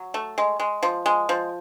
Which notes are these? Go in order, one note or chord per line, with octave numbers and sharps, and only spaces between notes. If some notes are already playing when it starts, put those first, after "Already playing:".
Already playing: F#3
A3
G#3
G#3
F3
G#3
F3